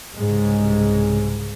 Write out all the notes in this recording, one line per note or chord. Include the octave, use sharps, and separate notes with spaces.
C2 G#2 C#3 G#3